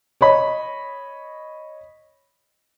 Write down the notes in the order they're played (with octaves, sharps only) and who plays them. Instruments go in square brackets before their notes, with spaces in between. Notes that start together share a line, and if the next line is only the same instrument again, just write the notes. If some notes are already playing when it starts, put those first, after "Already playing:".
[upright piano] C#5 D#5 B5